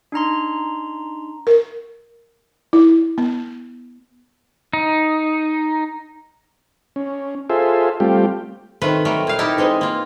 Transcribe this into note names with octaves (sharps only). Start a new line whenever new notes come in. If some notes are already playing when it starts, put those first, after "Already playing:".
D4 D#4 A#5 C6
A#4
E4
B3
D#4
C#4
F4 G#4 A4 C5 E5
G3 A3 C4 F4 G4
D#3 A3 C4 F4 B4
F#3 G3 A3 A#4
A#2 F5
D#4 E4 G4 A4 A#4
E3 G#3 C4 D#4
A#3 F4